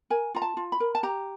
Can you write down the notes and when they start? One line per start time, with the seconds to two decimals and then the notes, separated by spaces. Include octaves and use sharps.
0.10 A#4 G#5
0.35 F4 A#5
0.42 A5
0.57 F4
0.72 B5
0.80 A#4
0.95 A5
1.03 G4 A#5